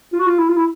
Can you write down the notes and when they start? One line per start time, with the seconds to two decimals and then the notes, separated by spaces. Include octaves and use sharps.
0.13 F4
0.20 F#4
0.27 F4
0.39 E4
0.49 F4
0.57 E4